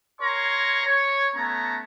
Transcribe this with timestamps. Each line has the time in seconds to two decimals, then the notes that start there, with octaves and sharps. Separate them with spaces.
0.21 A#4 C#5 G#5 A#5 C6 C#6
0.86 C#5
1.36 A3 B3 C#4 A5 A#5